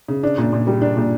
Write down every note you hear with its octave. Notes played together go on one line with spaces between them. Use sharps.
C#3
D4
A#2
A#2
G3
D4
A#2